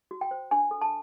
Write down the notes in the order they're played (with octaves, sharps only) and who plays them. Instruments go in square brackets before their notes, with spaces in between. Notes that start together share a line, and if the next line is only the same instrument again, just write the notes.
[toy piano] F#4
G5
C5
D4 G#5
A4
A5